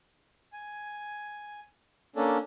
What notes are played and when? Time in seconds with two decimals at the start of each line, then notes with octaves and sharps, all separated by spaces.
0.53 G#5
2.16 A#3 C#4 D4 A4